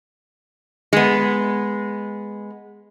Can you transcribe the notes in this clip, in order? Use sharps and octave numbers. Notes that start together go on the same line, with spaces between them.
G#3 B3